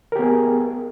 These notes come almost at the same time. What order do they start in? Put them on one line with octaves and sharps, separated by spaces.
A#4 G4 B3 G#4